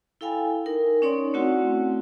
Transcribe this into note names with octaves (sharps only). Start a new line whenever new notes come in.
E4 A4 F5 G5 G#5 B5
D#4 A#4
C#4 D#4 C#5 D5 C6
A3 C4 E4 F#4 F#5